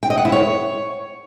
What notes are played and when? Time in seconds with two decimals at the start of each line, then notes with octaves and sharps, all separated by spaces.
0.03 G5
0.10 D#5
0.18 F#5
0.25 E4
0.32 C#5